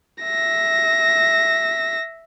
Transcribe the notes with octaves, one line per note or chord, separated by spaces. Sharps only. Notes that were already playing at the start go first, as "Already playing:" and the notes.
E5 A#6